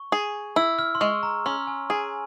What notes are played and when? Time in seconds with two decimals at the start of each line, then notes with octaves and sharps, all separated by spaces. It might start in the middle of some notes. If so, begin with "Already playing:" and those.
Already playing: C#6
0.12 G#4
0.56 E4 E6
0.79 F6
0.95 C6
1.01 G#3 C#6
1.23 A#5
1.46 C#4 C6
1.67 G#5
1.90 G#4 G#5